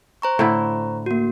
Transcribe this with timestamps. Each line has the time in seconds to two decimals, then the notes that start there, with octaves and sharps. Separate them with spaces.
0.22 C5 A#5 C#6
0.39 A2 D3 E4
1.06 A#3 F#4